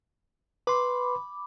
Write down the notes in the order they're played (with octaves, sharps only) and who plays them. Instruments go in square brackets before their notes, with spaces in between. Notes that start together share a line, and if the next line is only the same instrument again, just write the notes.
[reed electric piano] B4 C6 [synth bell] B5 D6